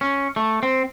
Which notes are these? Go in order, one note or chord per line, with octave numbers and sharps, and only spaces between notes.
C#4
A3
C4